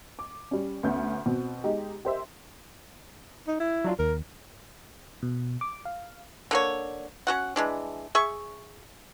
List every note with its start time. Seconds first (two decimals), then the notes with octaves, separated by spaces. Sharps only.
0.19 D6
0.51 G3 C#4
0.83 D2 B3 C#4 G6
1.26 B2 C4
1.64 G#3 D#4 G4
2.05 G4 A#4 C5 D#5 E5
3.47 D#4
3.60 E4
3.84 F#3 D4 F4
3.99 D#2 A#4
5.23 B2
5.61 D6
5.85 F5
6.51 D3 A#3 C#5
7.27 C#4 F#4 F#5
7.56 E3 G#3 D4
8.15 G#4 E5 C#6